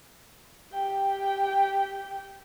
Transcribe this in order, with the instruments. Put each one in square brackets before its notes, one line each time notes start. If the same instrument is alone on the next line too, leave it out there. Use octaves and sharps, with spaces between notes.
[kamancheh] G4 G5